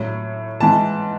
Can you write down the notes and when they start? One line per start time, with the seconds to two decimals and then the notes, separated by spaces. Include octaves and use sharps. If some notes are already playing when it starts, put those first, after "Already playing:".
Already playing: A2 F#3
0.60 G#2 E3 A5